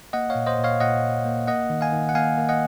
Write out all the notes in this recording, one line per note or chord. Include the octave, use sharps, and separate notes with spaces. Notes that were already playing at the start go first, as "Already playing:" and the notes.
A#3 D#5 F#5
C#5 F5
A#2
C5 D#5
A#2
C#5 F5
A#2 D#5 F#5
A#2
A#3
A#3 D#5 F#5
D#3
F5 G#5
D#3
F#5
A#3 F5 G#5
A#3
D#5 F#5